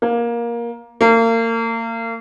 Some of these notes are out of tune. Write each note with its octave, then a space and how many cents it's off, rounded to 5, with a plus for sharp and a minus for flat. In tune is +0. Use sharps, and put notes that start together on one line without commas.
A#3 +15
A#3 -35